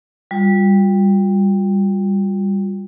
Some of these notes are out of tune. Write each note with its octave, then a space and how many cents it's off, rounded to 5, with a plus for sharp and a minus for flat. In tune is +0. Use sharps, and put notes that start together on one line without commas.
G3 +10 F4 +35